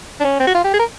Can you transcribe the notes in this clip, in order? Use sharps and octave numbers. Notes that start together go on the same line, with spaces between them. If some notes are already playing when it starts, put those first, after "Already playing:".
D4
C#4
C4
F#4
F4
G4
G#4
A#4